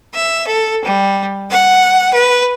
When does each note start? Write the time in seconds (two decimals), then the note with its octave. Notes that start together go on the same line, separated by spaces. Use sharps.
0.13 E5
0.47 A4
0.84 G3
1.50 F#5
2.13 B4